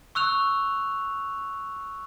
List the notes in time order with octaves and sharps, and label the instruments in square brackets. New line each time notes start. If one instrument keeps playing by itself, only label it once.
[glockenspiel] C#6 E6 F#6 F7